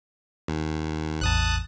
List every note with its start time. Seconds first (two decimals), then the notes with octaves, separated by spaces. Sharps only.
0.48 D#2
1.21 A1 E2 A5 D#6 F#6